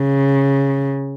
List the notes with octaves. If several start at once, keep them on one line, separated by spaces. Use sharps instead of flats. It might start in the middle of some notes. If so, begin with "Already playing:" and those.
Already playing: C#3